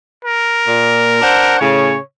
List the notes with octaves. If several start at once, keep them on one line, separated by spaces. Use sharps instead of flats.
A#4
A#2
D4 C5 F#5
A2 C#3 C#5